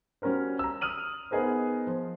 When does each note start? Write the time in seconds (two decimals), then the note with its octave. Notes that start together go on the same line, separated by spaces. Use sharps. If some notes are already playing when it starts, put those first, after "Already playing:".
0.22 G3 C#4 F#4 A#4 C5
0.59 A#5 E6
0.81 D#6 F6 D#7 F#7
1.31 B3 D#4 G#4 A#4 C5
1.87 F3